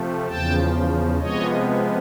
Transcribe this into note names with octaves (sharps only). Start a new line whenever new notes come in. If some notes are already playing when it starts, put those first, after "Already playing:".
Already playing: C3 F3 A3
E2 C#3 F3 G5 A5
C3 F3 G#3 B3 C#5 D#5